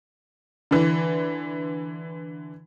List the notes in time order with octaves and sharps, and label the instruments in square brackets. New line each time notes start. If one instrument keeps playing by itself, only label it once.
[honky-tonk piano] D3 E3